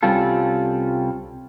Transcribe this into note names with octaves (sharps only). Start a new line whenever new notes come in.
C2 G3 C4 C#4 F4 A4